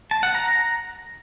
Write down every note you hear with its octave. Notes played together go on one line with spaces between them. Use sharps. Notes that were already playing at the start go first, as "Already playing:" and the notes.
A5
F#5
A#5